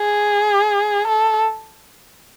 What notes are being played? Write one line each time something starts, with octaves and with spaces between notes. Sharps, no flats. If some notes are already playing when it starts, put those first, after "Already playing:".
Already playing: G#4
A4